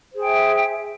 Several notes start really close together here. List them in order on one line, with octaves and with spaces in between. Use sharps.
C5 G#4 G5 E5